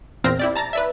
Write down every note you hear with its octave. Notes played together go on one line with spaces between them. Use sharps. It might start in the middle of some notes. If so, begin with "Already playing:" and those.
E2 A#2 C4 F6 A#6
E4 G4 D5
A5 A#5 A6 A#6
B4 D5 E5